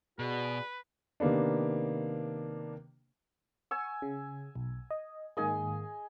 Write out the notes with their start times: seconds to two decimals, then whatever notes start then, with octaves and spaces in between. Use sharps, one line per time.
0.19 B2 F#4 G#4 B4 D5
1.20 C3 D#3 A#3 B3 D4
3.71 G#5 C#6 E6
4.02 C#3
4.55 B1
4.91 D#5
5.37 G#2 D#3 A#3 G#4 D#5 G#5